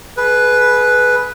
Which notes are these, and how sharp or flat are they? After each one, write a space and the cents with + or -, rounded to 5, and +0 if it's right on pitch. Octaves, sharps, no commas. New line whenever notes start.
G#4 +30 B4 +0